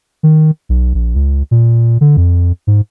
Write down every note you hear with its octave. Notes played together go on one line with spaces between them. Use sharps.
D#3
B1
A#1
C#2
A#2
D3
F2
G#2